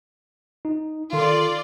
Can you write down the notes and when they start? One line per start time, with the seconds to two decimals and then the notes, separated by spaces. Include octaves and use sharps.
0.65 D#4
1.13 D#3 F4 A4 D5 C6